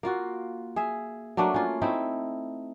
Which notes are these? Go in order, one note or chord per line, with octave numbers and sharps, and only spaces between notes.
A#3 F4 F#4
G#4 E5
F#3 A3 A#3 D4
C#4 F4
A3 C4 D#4 E4